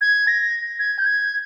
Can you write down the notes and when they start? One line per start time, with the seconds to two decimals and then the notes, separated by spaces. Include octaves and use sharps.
0.01 G#6
0.27 A#6
0.79 G#6
0.99 G6
1.06 G#6